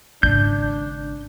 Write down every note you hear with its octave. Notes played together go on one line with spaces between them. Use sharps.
G#1 C#3 D4 G6